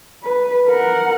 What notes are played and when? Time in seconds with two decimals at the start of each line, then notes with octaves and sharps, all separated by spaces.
0.23 B4
0.68 A#4 F#5